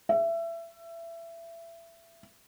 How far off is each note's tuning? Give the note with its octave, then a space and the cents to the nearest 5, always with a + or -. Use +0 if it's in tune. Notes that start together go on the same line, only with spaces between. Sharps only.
E5 +25